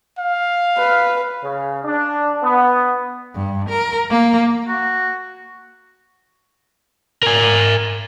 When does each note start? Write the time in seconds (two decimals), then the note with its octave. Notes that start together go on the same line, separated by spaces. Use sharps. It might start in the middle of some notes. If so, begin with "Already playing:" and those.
0.19 F5
0.78 B4
1.42 C#3
1.84 D4
2.42 B3
3.36 G2
3.69 A#4
4.11 A#3
4.68 F#4
7.23 A#4 G#5